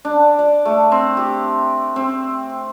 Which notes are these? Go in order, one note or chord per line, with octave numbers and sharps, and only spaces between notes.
D4
D5
A3
C4
G4
C4